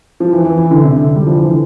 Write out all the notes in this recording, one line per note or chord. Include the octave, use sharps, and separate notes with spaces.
F3
E3
E3
E3
D3
C3
D3
G3
F3
E3
D3